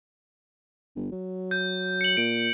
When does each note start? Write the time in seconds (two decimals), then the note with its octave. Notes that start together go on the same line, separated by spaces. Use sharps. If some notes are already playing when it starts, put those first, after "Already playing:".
0.96 G1
1.12 F#3
1.51 G6
2.01 C#7 F#7
2.17 A#2 D7